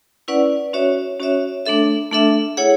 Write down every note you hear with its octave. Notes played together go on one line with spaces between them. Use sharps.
C#4 E4 B4 D5 F#5
C#4 F#4 C#5 E5
C#4 F#4 C#5 E5
A3 D4 A4 E5
A3 D4 A4 E5
E4 G#4 C#5 F#5